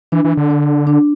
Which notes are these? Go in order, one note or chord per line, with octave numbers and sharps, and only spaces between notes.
E3 D4
E3
D3
D4
D4